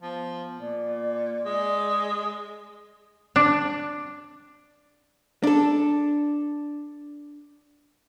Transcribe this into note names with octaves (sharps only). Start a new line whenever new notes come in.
F3 B3
A#2 D5
G#3
D4
D4 A4